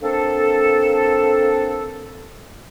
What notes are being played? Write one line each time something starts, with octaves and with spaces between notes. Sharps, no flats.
A#3 C4 D4 A4